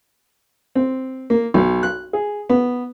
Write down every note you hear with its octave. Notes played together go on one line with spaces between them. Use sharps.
C4
A#3
B1
F#6
G#4
B3